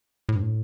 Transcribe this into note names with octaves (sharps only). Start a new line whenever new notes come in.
A2
G2
A2